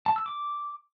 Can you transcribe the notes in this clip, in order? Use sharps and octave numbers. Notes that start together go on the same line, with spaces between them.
A5
E6
D6